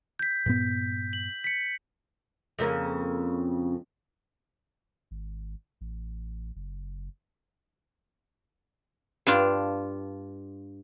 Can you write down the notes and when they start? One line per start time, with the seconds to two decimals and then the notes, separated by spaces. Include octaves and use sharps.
0.19 G6 B6
0.46 G2 A#2 B3
1.13 F#7
1.44 B6 C#7
2.59 F2 C#3 A#3
5.11 G#1
5.81 A1
6.56 F#1
9.27 G2 D4 F4